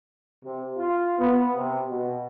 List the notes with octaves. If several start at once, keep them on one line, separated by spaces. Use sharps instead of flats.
C3
F4
B3
C3
B2